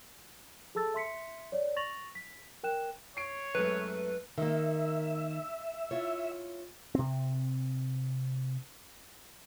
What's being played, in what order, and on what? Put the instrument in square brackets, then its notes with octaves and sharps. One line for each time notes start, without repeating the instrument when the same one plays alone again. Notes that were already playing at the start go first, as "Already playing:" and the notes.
[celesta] G#4 A4 A5 E6 A6
E5 C6 B6 C#7
C#5 D5
C#6 A6 A#6 F7 F#7
B6
A#4 G5 F#6 E7
[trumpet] C#5 [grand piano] C7 D7
[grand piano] F#2 G#3 A3 [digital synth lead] B4
[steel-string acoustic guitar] D#3 A#3 [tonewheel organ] E5
[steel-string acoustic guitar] E4 F4 C#5
[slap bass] C3 C4